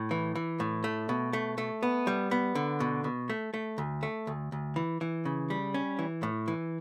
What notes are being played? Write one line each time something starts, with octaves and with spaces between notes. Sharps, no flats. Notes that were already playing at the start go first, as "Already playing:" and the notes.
Already playing: A2
E3
E3
A2
A3
B2
A3
A3
B3
G3
B3
D3
B2
B2
A3
A3
D2
A3
D2
D2
E3
E3
C#3
G3
C#4
E3
A2
E3